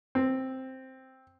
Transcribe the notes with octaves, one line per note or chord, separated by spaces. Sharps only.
C4